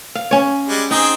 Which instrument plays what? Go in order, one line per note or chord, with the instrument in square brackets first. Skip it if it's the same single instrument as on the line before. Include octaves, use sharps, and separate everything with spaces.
[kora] F5
C#4 C#5
[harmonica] G3 G#3
[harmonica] C4 G#4 G5 [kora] D#4